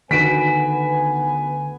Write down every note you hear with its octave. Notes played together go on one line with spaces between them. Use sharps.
D2 D#3 B3 F#4 B4 G#5 B6 D7